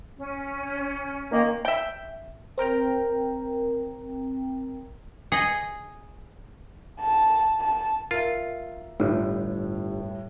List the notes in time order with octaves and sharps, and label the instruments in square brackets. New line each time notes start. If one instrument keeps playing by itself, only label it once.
[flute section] C#4
[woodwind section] D#3 A#3
[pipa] E5 G5
[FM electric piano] C4 A#4 G5 A#5
[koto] G#4 D#5
[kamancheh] A5
A5
[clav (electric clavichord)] F4 [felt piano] A#4 E5
[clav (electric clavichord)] G1 [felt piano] A2 G3